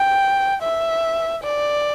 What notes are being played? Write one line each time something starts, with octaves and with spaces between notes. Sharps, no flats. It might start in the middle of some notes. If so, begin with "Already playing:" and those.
Already playing: G5
E5
D5